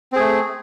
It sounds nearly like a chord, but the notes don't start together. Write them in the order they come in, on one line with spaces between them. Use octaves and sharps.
C4 G#4 A3